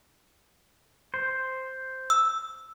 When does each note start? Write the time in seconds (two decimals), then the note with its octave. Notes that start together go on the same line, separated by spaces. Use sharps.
1.14 C5
2.10 E6